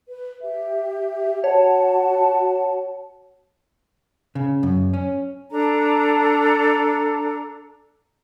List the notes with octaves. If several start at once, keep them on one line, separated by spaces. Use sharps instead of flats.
B4
G4 E5
F#4 C#5 F#5 A5
C#3
F#2
C#4
D4 A4 A#5